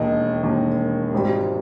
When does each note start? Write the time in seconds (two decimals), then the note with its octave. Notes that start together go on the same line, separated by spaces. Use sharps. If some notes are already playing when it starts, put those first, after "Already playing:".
Already playing: E1 D#2 D#3 D#5
0.43 E1 D#2 D#3
1.13 G#1 G#2 G3